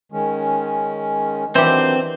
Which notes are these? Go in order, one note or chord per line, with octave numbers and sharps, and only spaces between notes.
D#3 G#3 C#4
D#3 E3 F#3 C4 D4 G4 C5